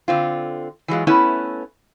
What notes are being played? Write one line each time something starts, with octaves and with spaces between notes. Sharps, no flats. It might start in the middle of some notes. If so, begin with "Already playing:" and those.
D3 C4 F4
E3 F#3 G#3 F4
A3 B3 C#4 E4 B4 E5